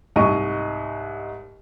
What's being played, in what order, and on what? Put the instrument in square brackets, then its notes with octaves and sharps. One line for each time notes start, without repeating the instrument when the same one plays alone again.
[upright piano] C2 G#2 D#5 C#6 D#7